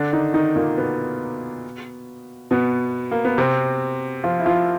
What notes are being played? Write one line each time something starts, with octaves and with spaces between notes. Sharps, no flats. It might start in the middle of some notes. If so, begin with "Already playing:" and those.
Already playing: D3 D4
D#3 D#4
D#3 D#4
A#2 A#3
B2 B3
B2 B3
A#3
B3
C3 C4
F3 F4
E4
F3 F4